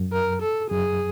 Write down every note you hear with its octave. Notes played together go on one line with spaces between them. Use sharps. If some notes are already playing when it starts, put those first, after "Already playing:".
Already playing: F#2
A#4
A4
F#2 G#4